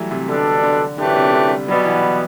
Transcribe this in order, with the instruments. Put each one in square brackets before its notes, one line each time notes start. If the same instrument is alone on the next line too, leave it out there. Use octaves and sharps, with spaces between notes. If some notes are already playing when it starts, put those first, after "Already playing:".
Already playing: [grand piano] E3 F#3 G3 A3
C3
[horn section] B2 G3 D4 A4 [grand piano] D3
[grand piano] D3
[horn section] F#2 E3 A3 D4 G4 [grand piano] D3
[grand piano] C3
D3
G3
[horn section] B2 G3 B3 [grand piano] F#3
[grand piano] E3
E3